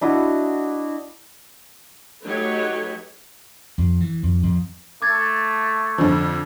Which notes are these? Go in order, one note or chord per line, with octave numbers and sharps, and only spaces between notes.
D4 E4 F#4 D#5
F#3 A3 D#4 G4 B4 C#5
F2
E3
F2
F2
A3 D6 G#6 A6
F2 D3 F3